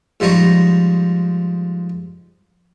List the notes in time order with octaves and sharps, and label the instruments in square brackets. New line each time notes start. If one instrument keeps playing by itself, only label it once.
[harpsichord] G#2 F3 G3 D#5 A#5 C#6